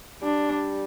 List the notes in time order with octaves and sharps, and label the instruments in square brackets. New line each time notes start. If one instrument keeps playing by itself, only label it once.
[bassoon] G3 [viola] D4